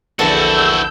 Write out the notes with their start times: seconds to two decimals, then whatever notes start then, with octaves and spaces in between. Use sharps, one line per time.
0.19 A#1 E2 D3 E4 F#4 A4 E6 G6